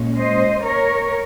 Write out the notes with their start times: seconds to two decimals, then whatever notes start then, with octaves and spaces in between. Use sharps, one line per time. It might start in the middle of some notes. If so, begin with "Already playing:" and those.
Already playing: A#2 G#3 C#4
0.18 C5 D#5
0.63 A#4 C#5